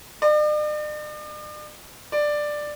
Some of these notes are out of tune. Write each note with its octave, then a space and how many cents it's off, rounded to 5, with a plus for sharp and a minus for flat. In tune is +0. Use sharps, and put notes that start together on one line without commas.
D5 +45
D5 +10